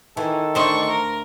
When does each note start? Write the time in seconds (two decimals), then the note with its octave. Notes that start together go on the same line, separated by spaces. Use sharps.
0.17 D#3 E3 A4
0.55 D2 D4 C5 D#5 C#6
0.89 A#4